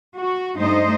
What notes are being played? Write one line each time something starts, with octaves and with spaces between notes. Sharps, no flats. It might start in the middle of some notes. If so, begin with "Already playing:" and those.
F#4
G2 A3 D#4 C5 D#5